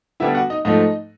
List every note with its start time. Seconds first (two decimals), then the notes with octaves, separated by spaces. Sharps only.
0.20 D3 G3 B3 D4 E4 E5
0.35 F#4 F#5
0.50 D#4 D#5
0.65 G#2 F3 A3 D#4 D#5